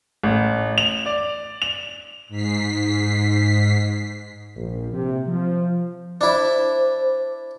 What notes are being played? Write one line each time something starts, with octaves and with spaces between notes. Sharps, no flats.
A1
F7
D5
F7
G#2 B6 C7
A#1
C3
F3
D4 E4 C5